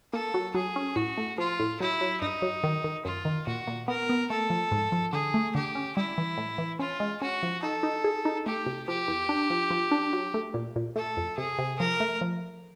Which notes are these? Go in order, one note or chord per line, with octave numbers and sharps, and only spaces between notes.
A#3 A4
F#3
F#3 G#4
C#4
A2 F#4
A3
F3 F4
A2
F#3 E4
F#3
G2 D#4
F#3
D#3
D#3
F#2 F4
D#3
A#2 F#4
A#2
B3 A#4
B3
A3 A4
F3
G#2
F3
D3 G#4
A3
D3 G4
C#4
G3 E4
E3
A2
E3
C#4 F4
G#3
C#4 F#4
F3
D#4 A4
D#4
G#4
D#4
A3 G4
C3
F3 G4
E2
D4
F3
F3
D4
F#3
A3
A#2
A#2
A3 A4
F2
C3 G#4
C3
F3 A#4
A3
F3